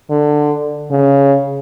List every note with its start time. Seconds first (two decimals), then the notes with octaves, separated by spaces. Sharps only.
0.10 D3
0.91 C#3